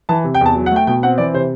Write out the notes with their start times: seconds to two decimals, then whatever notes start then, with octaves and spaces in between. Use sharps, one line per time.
0.09 E3 A5
0.24 C3
0.35 G5
0.41 E2 A5
0.55 F#3
0.66 F#5
0.71 A3 G5
0.87 B2 G5
1.03 C4 F#5
1.18 E3 D5
1.34 C3 C5